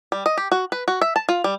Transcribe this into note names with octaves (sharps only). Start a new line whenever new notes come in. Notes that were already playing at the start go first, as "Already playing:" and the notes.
G3
D#5
G4
F#4
B4
F#4
E5
A5
F4
G3